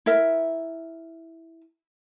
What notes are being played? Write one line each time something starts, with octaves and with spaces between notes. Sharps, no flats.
E4 A#4 E5